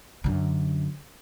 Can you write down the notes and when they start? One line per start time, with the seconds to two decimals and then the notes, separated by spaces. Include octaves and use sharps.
0.24 F#2 D3